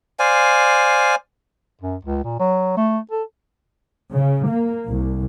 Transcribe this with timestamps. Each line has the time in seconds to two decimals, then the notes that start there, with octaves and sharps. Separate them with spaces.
0.19 C5 D5 F5 G#5
1.81 F#2
2.05 C#2
2.24 A#2
2.40 F#3
2.77 A3
3.11 A4
4.12 C#3
4.48 A#3
4.89 C2